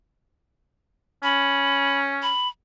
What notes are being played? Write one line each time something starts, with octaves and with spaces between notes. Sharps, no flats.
C#4 B5
B5